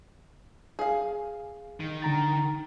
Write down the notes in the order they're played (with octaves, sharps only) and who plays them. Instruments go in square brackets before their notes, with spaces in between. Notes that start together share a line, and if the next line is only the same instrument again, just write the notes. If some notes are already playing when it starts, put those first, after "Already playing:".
[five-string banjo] G#4 F5
[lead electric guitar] D#3
[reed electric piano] D3 A#5 A6